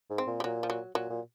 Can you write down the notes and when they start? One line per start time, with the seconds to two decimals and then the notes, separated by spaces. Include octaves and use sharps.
0.10 G#2
0.18 C4
0.27 A#2
0.40 G3
0.44 A#2 F#3
0.63 F3
0.70 F#3
0.95 A#2 F#3
1.10 A#2